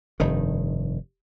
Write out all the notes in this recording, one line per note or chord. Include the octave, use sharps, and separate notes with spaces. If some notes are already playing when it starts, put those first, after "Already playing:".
F1 G2 D#3